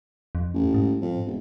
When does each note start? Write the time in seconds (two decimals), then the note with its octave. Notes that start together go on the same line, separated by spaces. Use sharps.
0.35 F2
0.54 A1
0.74 G#2
1.01 F2
1.26 E1